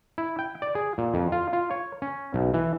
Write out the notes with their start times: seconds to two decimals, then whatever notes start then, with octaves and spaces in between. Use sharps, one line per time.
0.18 E4
0.39 G5
0.62 D5
0.75 G#4
0.98 A#2
1.14 F2
1.32 F4
1.53 F4
1.71 C#5
2.02 C#4
2.34 B1
2.54 E3